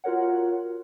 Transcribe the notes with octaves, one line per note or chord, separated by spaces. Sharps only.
F4 F#4 A#4 C#5 F#5